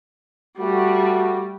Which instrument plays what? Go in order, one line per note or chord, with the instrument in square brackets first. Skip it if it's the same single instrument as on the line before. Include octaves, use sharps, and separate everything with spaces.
[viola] G3 [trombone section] A3 F#4